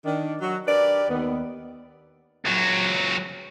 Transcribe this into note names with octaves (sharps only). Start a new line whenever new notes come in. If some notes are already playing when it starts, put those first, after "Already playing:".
D#3 D4
F#3 F#4
D4 G4 A#4 B4 D5
D#2 D#3 B3
C#2 F#3